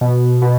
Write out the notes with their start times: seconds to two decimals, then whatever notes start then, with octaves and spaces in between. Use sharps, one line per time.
0.01 B2
0.42 B2